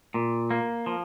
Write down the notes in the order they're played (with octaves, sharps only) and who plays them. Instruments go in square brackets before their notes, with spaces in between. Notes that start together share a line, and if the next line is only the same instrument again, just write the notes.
[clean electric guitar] A#2
A#3
F3